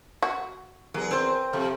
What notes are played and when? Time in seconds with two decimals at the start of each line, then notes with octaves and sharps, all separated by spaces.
0.22 F#4
0.94 E2 F#3 G#4 A#4
1.11 C4 C5
1.53 C3 F3 A4